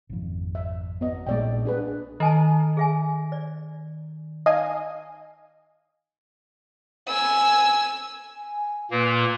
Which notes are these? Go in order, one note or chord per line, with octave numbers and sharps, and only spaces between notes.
G#1 F2
E5
B3 D#5
A#1 A#2 G#3 D5 G5
D4 G#4 B4
D#3 A4 G#5 A5
G#4 E5 G#5
D5
D#4 D#5 F5 G#5
G#5 E6
G#5
A#2 A#3 B4